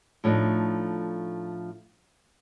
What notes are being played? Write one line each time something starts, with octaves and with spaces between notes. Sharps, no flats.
A2 F3 A3 D4 D#4